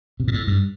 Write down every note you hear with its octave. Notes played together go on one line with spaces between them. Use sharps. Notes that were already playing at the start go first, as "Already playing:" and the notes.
C3
A#2
A2
G2